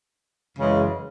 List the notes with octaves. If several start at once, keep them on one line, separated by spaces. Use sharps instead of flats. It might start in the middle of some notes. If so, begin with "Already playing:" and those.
F#2 C#3 E3 G#3